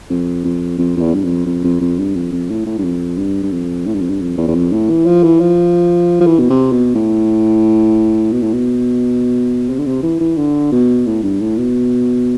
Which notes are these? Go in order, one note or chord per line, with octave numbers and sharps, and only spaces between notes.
F2
F2
F2
F2
E2
G2
F2
F2
F2
F2
G2
F2
F2
A2
A2
G2
F2
G2
G2
F2
A2
G2
F2
G2
F2
E2
E2
F2
A2
E3
F3
E3
F3
F3
E3
B2
C3
B2
A2
B2
A2
B2
C3
D3
C3
E3
E3
D3
B2
A2
G2
A2
B2